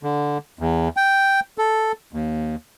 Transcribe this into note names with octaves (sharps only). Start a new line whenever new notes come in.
D3
E2
G5
A4
D#2